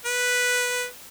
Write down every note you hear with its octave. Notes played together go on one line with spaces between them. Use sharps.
B4